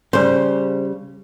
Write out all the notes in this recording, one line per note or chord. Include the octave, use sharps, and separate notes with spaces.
C#3 G3 C5